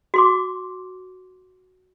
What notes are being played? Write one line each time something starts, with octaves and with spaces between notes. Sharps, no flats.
F#4 C6 D6